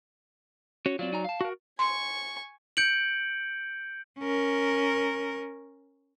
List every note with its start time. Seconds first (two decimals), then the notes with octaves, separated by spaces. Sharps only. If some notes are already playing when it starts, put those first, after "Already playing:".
0.86 C#4 F#4 C#5
0.99 F#3 C4 F4 D5
1.13 D#4 G#5 A#5
1.24 F5 A5
1.41 F#4 A#4
1.79 G#5 C6 C#6
2.77 G6 C#7 D7 F#7
4.19 C#4 A#4